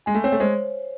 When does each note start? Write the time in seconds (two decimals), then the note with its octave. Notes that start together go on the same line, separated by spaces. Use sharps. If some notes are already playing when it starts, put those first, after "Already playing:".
0.06 G#3 G#5
0.15 A3
0.24 C4 C#5
0.32 A3
0.40 G#3 C5